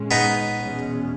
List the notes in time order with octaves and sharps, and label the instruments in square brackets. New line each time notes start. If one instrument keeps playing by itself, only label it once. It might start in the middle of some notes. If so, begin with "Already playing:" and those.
Already playing: [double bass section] A#2 G#3 C#4
[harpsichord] B3 D#4
[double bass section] E2 B2 G#3 C#4